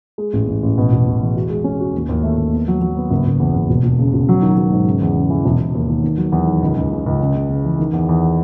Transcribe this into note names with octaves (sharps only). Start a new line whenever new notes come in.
G#3
A1
A1
A1
B2
E1
E1
E2
F#4
G#3
C#4
F#4
D#2
D#2
A3
D#2
B3
F#3
F#3
B3
F#1
F#1
E2
F#1
E1
E1
C#3
E1
F#3
D#3
F#3
G#2
C#3
E2
C#3
E3
E1
E1
D#2
D#3
D#3
F#3
E2
D#3
C#2
C#2
C#3
C#2
C#3
C#3
C#3
E3
D#3
E2
E2